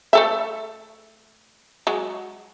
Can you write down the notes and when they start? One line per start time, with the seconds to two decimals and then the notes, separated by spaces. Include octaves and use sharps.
0.13 A3 A4 E5
1.87 F#3 G#3